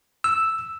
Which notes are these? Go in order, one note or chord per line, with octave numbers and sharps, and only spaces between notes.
E6